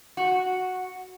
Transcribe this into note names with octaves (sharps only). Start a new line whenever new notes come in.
F#4